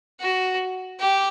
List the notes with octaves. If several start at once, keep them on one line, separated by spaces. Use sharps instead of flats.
F#4
G4